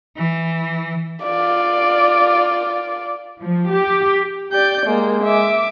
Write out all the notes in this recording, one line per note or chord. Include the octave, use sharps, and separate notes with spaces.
E3
F4 D5
F3
G4
G4 D5 G6
G#3 A#3
E5 D6